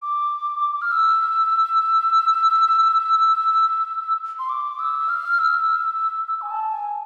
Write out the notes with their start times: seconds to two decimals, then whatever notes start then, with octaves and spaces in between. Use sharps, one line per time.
0.02 D6
0.82 F6
0.92 E6
4.39 C6
4.49 D6
4.79 E6
5.09 F6
5.39 E6
6.28 E6
6.42 G#5
6.51 A5
6.72 G#5